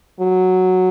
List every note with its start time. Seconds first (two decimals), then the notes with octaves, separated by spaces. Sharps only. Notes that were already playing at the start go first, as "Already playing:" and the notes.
0.20 F#3